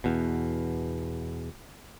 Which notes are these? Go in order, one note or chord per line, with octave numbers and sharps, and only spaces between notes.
E2 B2